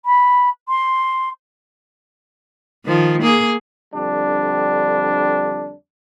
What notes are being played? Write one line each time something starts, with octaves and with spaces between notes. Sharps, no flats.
B5
C6
D#3 F3
A#3 G#4
F2 D3 G3 D4